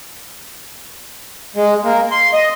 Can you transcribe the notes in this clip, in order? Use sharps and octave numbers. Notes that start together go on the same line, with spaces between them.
G#3
A#3
C6
D#5